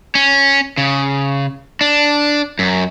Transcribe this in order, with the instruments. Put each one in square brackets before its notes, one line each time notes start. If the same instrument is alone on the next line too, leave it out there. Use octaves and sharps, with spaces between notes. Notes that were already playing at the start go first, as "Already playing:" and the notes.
[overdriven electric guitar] C#4
C#3
D4
F#2